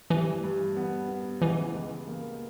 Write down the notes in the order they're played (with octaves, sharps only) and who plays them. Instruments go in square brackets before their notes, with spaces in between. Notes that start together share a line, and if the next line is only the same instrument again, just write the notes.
[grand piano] G2 [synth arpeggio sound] E3
[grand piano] G2
B3
B3
[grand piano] C#2 [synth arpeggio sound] E3
[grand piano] C#2
A#3